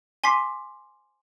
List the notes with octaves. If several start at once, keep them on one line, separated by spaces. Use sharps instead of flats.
G#5 C6 D6 B6 C7